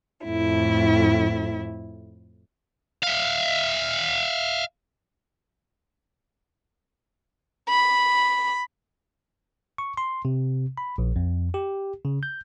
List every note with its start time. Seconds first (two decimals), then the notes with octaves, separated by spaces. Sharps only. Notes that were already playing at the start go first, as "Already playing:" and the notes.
0.24 F2 A2 E4
3.03 E5 F5
7.69 B5
9.78 C#6
9.97 C6
10.25 C3
10.78 B5
10.98 A#1
11.16 F2
11.54 G4
12.05 C#3
12.23 G6